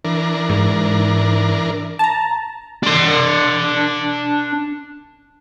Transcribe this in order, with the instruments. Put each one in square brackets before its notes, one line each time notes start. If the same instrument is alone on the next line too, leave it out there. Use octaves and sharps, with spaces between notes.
[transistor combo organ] E3 D4 A#4
[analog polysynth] G#2
A5 A#5
[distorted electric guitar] D4 C6